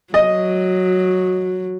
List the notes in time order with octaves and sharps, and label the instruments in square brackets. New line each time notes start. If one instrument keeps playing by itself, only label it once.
[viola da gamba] F#3 [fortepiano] D#5